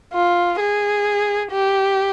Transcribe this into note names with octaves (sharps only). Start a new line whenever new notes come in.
F4
G#4
G4